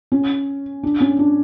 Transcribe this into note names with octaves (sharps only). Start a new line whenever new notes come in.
C#4
D4
C#4
D4